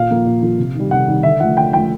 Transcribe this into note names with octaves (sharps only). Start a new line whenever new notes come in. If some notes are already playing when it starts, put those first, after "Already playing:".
Already playing: A#2 F5
F3 A#3
A#2
F3 A#3
C3
D#3 G3
C3 F#5
D#3 G3
D3 E5
F3 A3 F#5
D3 G5
F3 A3 G5